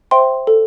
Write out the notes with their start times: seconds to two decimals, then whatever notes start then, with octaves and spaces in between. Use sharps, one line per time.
0.11 C5 E5 G5 C6
0.47 A4